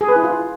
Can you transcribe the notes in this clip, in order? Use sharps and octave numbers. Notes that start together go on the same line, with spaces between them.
G#4
B4
E4
F4